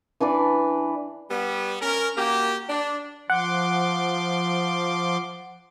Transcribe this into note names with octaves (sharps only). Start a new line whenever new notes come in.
E3 D4 B4 D5
G3 B3
C#4 A#4
A#3 F#4 G4
D4
F3 F#5 C6 D6